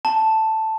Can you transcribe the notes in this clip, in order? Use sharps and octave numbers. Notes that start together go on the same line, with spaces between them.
A5